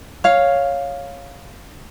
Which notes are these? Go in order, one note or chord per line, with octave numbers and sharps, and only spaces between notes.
C#5 F5